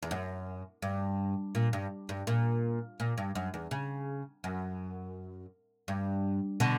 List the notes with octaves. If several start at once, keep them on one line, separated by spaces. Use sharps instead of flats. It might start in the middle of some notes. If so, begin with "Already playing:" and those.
E2
F#2
G2
A#2
G2
G2
A#2
A#2
G2
F#2
E2
C#3
F#2
G2
B2 D3